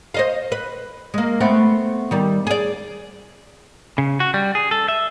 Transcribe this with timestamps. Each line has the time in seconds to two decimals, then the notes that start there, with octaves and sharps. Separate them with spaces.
0.14 C5 D#5 F5
0.52 B4
1.14 G#3 A#3
1.40 A3 B3 C4
2.11 D#3 G3
2.47 G#4 D5
3.98 C#3
4.20 F#4
4.34 G3
4.55 G#4
4.71 A4
4.88 E5